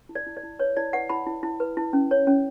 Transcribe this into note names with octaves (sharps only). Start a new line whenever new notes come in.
E4
D5
E4
D5
E4
B4 C#5
E4 D5
B4 F#5
E4 B5
E4
E4
B4
E4
C#4
C#5
C#4